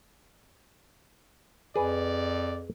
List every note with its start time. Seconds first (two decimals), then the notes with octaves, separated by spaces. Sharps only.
1.76 F2 G#4 B4 D5